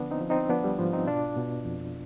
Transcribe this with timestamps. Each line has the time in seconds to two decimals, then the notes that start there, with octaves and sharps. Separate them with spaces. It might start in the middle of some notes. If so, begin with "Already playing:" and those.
Already playing: D3 F3 B3 D4
0.11 C4 D#4
0.21 F3
0.30 C4 D#4
0.49 F3 B3 D4
0.64 G3
0.78 G#2 F3
0.93 C4 D#4
1.07 B2 D4 F4
1.36 B2
1.65 F2